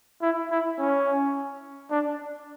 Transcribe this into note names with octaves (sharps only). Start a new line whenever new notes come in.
E4
E4
C#4
D4